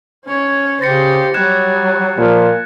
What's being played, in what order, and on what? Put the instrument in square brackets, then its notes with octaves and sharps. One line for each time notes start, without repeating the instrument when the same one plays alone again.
[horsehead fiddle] C#4 C#5
[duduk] C#3 [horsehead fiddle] G4 C5 [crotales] A6 A#6 C#7
[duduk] F#3 [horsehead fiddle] G3 [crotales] F#6 G#6 E7
[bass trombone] A#2 [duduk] F3